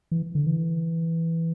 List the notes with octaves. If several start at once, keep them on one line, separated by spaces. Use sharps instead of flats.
E3
D3
E3